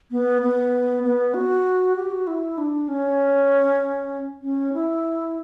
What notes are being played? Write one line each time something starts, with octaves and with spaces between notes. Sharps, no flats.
B3
B3
B3
F#4
G4
F#4
E4
D4
C#4
C#4
E4